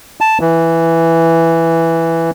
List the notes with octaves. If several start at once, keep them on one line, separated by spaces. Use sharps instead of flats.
A5
E3